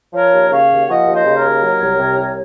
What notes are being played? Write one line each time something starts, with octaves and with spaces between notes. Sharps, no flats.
F3 A#4 C#5
D#2
C#3 C#5 F5
D#2
F3 D#5 F#5
D#2
C5 D#5
C#3
A#4 C#5
D#2
F#3
C2
C3
C2